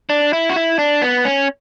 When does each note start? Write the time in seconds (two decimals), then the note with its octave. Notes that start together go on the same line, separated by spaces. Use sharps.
0.10 D4
0.33 E4
0.50 F#4
0.56 E4
0.79 D4
1.02 B3
1.25 C#4